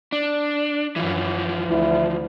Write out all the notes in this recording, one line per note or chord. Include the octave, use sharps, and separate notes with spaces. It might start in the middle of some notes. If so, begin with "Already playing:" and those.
D4
F#2 E3 F3
D2 E4